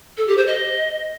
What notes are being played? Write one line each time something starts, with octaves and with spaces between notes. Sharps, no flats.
A4
G4
C5
D#5